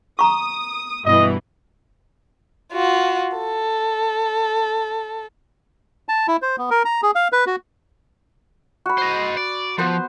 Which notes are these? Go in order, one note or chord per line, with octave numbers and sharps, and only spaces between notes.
A#5 C#6 D#6
G2 B2 E3 D#5
F4 F#4
A4
A5
E4
C5
B3
A#4
A#5
G#4
F5
B4
F#4
F#4 B5
C5 D#5
D5
F3 B3 B4 C5